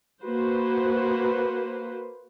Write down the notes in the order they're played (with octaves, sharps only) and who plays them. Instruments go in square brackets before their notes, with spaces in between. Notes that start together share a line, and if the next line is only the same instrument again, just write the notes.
[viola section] A#3 F#4 B4 C5